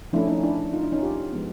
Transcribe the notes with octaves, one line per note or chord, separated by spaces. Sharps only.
F3 A3 C#4 D4 E4
C#4 D#4
D4 E4
D#4 F4
D4 E4
C#4 D#4
F4 G4
F3 G#3 B3